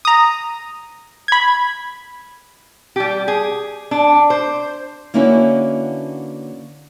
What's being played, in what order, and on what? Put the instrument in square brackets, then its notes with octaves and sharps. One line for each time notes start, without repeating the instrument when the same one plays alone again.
[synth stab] A#5 D#6
B5 G#6
[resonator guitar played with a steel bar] G3 G4
G#4
D4
C5
[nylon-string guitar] D3 A#3 C#4 E4 F#4 B4